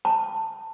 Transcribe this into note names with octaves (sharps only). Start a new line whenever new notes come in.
A5